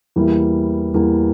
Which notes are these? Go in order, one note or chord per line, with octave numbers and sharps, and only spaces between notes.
E2 E3 G3 A#3 E4
E2 E3 G3 A#3 E4